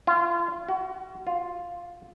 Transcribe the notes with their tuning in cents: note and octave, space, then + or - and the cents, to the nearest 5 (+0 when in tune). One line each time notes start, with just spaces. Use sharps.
F4 -30
F#4 +25
F4 +5